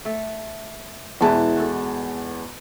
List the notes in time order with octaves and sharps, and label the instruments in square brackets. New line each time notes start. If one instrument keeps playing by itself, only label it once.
[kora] A3 A4
[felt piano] E2 G#3 A5 [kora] B2 E3 D#4
[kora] F#4 A4